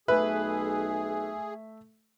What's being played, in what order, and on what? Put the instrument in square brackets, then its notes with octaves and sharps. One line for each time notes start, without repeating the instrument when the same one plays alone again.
[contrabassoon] B1 [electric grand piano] A3 E5 [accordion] G#4 [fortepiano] B4